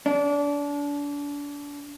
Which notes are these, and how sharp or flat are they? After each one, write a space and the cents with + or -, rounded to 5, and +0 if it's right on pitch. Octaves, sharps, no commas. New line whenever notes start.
D4 -30